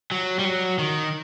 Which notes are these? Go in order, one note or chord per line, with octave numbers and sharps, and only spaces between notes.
F#3
G3
F#3
D#3